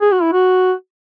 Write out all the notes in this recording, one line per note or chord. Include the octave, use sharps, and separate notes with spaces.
G#4
F#4
E4
F#4